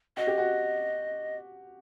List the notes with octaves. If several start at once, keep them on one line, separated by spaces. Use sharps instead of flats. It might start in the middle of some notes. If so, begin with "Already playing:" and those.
F#4 D#5
G4
F#4